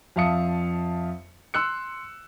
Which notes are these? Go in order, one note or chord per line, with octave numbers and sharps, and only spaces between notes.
F2 E5 F5 A5 D#6 C#7
C6 E6 F#6 C#7